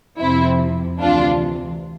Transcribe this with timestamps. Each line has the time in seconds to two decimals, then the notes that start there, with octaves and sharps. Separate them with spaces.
0.20 F2 C3 F3 C4 E4
1.01 D2 C3 E3 D4 F4